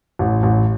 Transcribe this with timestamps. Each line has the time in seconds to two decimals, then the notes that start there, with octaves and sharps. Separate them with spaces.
0.19 A1
0.43 A1